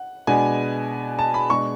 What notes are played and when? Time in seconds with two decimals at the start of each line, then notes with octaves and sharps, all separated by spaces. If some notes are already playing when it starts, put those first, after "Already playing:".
Already playing: F#5
0.27 B2 G#3 B3 D4 G#5
1.19 A5
1.34 B5
1.50 B2 G#3 D4 C#6